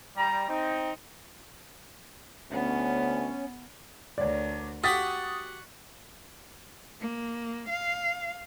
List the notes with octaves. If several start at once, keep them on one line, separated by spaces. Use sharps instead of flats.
G3 A#5
C4 D#4
D2 B3 C#4
D2 A#4 C#5 D5
F#4 G4 F#5 C#6 D#6 F#6 A6 B6
A#3
F5